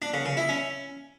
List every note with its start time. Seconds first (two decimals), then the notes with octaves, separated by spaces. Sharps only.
0.02 D4
0.14 C#3
0.25 C#3
0.37 E4
0.49 C#4